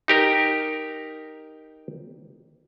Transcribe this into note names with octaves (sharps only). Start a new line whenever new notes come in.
D#4 G4 A#4